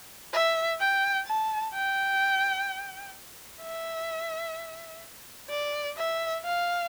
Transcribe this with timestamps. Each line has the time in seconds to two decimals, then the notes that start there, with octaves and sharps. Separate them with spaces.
0.33 E5
0.80 G5
1.27 A5
1.74 G5
3.62 E5
5.50 D5
5.97 E5
6.44 F5